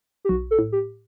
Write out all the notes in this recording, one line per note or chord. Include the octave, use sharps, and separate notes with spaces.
G4
B1 F#4
A4
A2
G4